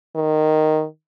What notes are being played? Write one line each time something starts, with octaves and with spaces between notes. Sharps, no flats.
D#3